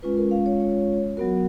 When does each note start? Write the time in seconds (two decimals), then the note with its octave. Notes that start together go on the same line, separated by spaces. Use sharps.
0.02 G#3 C#4 F4 B4
0.17 A#4
0.31 F5
0.46 C#5
0.60 C#5
1.17 F#3 B3 F#4 A#4